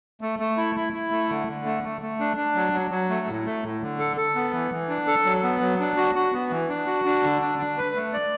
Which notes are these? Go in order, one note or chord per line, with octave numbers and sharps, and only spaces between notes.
A3
A3
E4
E4
E4
A3
D3
D3
A3
A3
A3
D4
D4
F#3
F#3
F#3
A3
A2
A3
A2
D3
A4
A4
B3
E3
E3
D4
A4
F#3
B3
F#3
D4
F#4
F#4
B3
E3
D4
F#4
D4
D3
D4
D4
B4
A3
D5